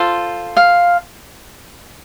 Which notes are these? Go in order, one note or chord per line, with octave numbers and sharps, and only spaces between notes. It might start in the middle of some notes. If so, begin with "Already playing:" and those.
Already playing: F4 A4 C5
F5